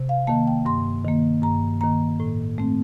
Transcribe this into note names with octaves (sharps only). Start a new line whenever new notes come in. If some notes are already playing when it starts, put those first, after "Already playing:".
Already playing: C3
F5
D#3 A#3 A5
G5
G2 C6
D#3 A#3
G2 A#5
D#3 A#3 A#5
A2
A3 C4